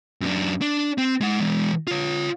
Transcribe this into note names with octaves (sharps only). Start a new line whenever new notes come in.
F#2 D4
D4
C4
G#3 F#5
E3 G#3
F4 C#5